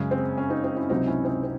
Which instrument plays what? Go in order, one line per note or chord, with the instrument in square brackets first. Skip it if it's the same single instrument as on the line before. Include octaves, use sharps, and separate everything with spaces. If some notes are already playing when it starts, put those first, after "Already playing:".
Already playing: [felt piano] F#2 C#3 G#3 C#4
C4
C#4
C4 D#4
C4 D#4
C#4 E4
C#2 C3 F#3 C4 D#4
C#4 E4
C4 D#4
C4